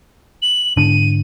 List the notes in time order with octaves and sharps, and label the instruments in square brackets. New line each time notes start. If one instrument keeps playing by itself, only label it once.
[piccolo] F#7
[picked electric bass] G#2 D3 D4 [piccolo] D#7